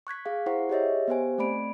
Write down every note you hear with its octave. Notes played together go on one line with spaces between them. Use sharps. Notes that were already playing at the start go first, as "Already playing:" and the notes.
C#6 F#6 G#6 B6
G#4 F5
E4 G#4 C5 F#5 C#6
G4 G#4 C#5 D#5 E5
B3 G4 C5 G#5
A3 C4 D5 B5 D7